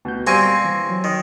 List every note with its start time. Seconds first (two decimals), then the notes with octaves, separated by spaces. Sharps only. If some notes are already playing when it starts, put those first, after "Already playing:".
0.05 D2 B2 G6
0.27 G3 A#3 C4 G#5 C#6 G#6 D#7
0.65 E3
0.90 F#3
1.04 D#3